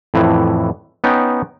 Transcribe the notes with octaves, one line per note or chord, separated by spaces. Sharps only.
F2 A2 E3
B3 C#4 D#4 G5